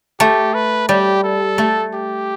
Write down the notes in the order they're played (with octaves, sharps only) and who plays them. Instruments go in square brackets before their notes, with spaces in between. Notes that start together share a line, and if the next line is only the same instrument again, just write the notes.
[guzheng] A3 [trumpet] G4
[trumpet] B4
[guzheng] G3 [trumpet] G4
[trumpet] A4
[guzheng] A3
[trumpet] G4